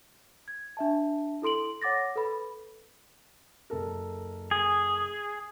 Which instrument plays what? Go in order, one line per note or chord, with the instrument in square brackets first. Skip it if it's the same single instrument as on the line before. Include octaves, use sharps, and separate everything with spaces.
[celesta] G#6
D4 E5 A5
E4 A4 C6 D7 F#7
C#5 F#5 D6 A6 A#6
A4 B4 B5
[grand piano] F#1 A4 A#4
[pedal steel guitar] G#4